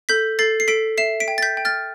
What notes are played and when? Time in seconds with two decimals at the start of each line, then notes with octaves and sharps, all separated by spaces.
0.09 A4 G6 B6
0.39 A4 A6 C7
0.60 C7
0.68 A4 B6 D7
0.98 E5 C7 E7
1.20 B6 D7
1.28 G5
1.38 A6
1.42 G6 B6
1.57 G5
1.65 F6 A6